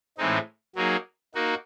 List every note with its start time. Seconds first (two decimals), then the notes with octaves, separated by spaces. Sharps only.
0.18 A2 E3 G#3 C4 D#4
0.75 F#3 A#3 D#4 G#4
1.35 A#3 D#4 F#4